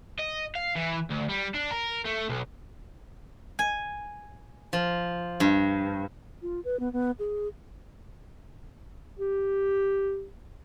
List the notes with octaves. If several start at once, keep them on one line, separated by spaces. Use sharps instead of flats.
D#5
F5
E3
D2
G3
D4
A#4
A3
B1
G#5
F3
G2
F4
B4
B3
B3
G#4
G4